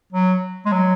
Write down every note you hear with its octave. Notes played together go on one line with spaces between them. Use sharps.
F#3
G#3
F#3